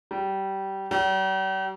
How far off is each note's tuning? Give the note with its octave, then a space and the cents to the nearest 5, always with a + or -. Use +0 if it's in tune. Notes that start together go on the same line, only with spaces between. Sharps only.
G3 -20
G3 -45